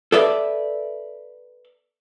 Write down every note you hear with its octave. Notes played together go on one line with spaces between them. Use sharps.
A4 B4 D5 E5